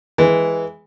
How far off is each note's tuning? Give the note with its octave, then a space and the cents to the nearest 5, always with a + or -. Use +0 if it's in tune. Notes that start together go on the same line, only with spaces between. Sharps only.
E3 +0 G#3 +0